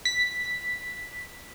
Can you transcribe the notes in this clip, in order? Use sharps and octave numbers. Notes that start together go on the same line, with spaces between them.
B6